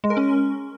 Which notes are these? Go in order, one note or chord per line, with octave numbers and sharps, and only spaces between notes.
G#3
A#4
C#4